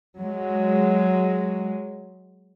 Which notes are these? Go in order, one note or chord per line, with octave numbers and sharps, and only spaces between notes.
F#3 G#3